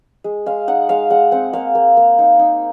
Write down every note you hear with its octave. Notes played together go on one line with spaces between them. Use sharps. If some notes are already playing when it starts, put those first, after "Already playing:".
G#3
G#3 F5
D#4 F#5
G#3 F5
G#3 F#5
C4 F#5
A#3 F5
A#3
A#3
D#4
D#4